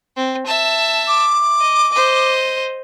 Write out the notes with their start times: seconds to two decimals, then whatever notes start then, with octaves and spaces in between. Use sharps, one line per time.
0.17 C4
0.47 E5 A5
1.08 D6
1.60 D#5
1.92 C5 D#5